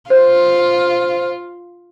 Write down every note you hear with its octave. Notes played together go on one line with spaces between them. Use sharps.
F4 C5